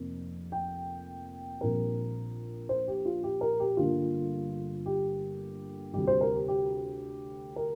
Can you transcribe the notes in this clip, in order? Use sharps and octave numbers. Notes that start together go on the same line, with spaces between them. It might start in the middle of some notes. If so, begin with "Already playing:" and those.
Already playing: F1 F2 C3 A#3
G5
A#1 A#2 G3 C4 A#4
C5
G4
F4
G4
A#4
G4
G1 G2 D3 A#3 F4
G4
D2 C3 G3 G4
C5
A#4
G4
G4
A#4